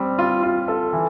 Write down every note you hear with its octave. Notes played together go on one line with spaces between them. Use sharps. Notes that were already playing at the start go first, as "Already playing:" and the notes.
Already playing: G3 C4
F4
F4
A4
E3